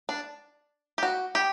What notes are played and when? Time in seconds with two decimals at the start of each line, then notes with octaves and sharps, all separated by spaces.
0.09 D4
0.98 G4
1.03 F#4
1.35 G4